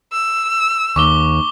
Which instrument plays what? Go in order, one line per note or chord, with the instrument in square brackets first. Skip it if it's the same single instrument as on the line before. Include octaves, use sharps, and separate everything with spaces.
[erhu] E6
[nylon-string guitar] D#2 [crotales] C#6 D6 G7